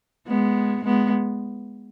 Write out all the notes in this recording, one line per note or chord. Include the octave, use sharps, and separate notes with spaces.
G#3 B3
G#3 B3